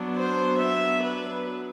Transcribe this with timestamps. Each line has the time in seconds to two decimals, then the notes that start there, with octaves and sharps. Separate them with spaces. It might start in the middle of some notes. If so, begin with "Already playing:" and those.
Already playing: F#3 B3 D4
0.15 C5
0.60 E5
1.03 B4